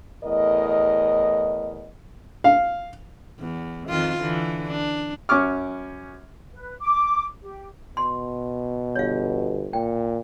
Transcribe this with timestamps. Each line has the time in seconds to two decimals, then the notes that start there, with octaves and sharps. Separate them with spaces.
0.24 E2 A2 A#4 D#5
2.44 F5
3.39 E2
3.89 F2 D#3 F4
4.20 D3 E3
4.67 D4
5.29 F#2 C#4 C#6 D6 F6
6.54 B4
6.80 D6
7.42 G4
7.97 B2 C6
8.96 G1 C#5 F5
9.73 A#2 G5